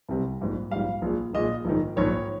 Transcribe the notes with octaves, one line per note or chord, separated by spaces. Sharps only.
C2 C3 G3
A#1 G#2 G3
A#1 G#2 G3 F5
A#1 A#2 F3 G#3
A#1 A#2 F3 G#3 D#5
A#1 G#2 D#3
A#1 G#2 D#3 C#5